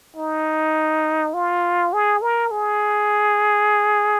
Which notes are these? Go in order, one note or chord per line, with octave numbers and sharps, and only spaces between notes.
D#4
F4
G#4
A#4
G#4